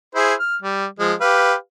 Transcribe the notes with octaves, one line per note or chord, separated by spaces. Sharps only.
E4 G#4 C5
F6
G3
F3 G#3
G4 B4 F5